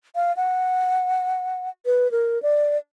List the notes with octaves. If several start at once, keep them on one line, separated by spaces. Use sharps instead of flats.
F5
F#5
B4
A#4
D5